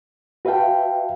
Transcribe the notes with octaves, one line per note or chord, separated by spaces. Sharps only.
F#4 B4 E5 F5 G5 A5